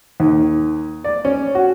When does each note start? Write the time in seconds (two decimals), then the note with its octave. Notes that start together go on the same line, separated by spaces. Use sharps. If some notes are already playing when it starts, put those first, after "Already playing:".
0.20 D#2
1.04 D5
1.25 C#4
1.55 F#4